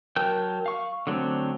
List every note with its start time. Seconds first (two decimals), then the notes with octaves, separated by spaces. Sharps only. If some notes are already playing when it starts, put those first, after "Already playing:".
0.16 F#3 A#4 G5 A5 G6
0.66 F5 C#6
1.07 D3 F#3 A3 C4